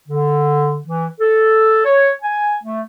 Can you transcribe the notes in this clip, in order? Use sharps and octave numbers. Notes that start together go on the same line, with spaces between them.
D3
E3
A4
C#5
G#5
A3